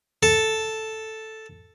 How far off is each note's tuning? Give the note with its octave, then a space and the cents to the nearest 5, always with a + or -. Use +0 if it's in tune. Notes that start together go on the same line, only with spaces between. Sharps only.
A4 +0